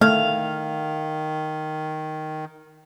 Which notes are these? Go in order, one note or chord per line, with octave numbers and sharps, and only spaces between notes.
D#3 A3 F5